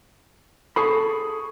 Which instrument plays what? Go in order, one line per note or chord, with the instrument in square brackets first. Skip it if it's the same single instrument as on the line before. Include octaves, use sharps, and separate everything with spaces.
[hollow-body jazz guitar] G#4 A4 B5 [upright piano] C#6 D#6 C7